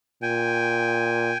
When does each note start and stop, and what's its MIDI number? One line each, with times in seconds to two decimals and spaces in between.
0.22 1.33 46
0.22 1.38 79
0.22 1.38 80